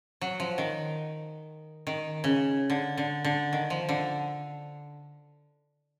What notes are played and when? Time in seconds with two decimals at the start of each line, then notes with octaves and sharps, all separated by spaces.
0.21 F#3
0.40 F3
0.58 D#3
1.87 D#3
2.24 C#3
2.70 D3
2.98 D3
3.24 D3
3.53 D#3
3.70 F3
3.89 D3